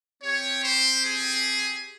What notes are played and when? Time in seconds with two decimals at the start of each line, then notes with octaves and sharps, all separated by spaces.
0.22 C4 G4 C#5
0.63 C5
1.04 G#4